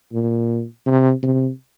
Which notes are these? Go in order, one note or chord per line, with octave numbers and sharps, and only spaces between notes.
A#2
C3
C3